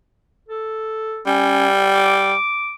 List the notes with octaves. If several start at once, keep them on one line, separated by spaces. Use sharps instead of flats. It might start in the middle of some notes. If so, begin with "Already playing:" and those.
A4
G3 C#4
D6